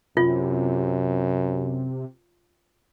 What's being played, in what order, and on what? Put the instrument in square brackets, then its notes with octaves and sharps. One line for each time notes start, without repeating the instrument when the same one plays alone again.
[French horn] F#2 [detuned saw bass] C3 [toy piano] F4